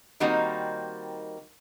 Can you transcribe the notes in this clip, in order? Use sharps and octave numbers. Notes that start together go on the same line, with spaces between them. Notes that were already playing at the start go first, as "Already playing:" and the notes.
D#3 G3 A#3 C4 D#4 F#4